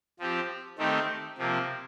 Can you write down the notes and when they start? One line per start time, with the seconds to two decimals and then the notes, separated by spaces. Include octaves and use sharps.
0.19 F3 C4 G4
0.78 D#3 A3 C4 D#4 G4
1.38 C3 F3 A#3